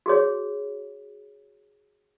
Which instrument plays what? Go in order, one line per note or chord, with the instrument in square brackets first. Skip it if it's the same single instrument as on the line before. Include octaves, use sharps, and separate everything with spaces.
[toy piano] F#4 G#4 C#5